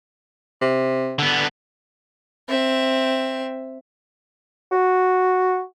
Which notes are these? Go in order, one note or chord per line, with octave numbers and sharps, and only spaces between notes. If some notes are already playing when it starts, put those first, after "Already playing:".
C3
D3 B3
C4 E5
F#4